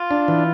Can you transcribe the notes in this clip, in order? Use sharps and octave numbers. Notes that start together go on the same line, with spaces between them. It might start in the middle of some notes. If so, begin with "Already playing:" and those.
Already playing: F4
D4
E3